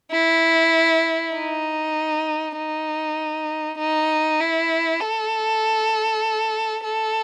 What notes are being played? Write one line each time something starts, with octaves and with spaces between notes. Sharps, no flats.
E4
D#4
D#4
D#4
E4
A4
A4